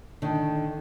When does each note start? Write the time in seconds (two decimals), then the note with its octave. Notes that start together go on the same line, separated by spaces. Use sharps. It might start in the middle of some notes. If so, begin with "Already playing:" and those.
0.22 D3 D#3